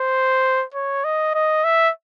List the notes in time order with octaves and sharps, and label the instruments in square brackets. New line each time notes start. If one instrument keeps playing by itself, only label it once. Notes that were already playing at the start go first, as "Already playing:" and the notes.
Already playing: [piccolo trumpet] C5
C#5
D#5
D#5
E5